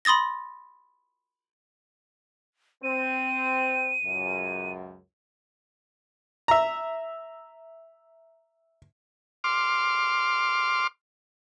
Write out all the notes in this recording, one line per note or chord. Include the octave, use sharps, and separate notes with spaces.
B5 C6 D#6 A6 A#6
C4 D#7
C#2 F#2
E5 A#5
C6 D6 F6